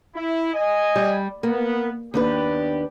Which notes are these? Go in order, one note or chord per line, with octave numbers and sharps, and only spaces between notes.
E4
D#5 G#5
G3
A#3 B3
D#2 B3 D4 G4 B4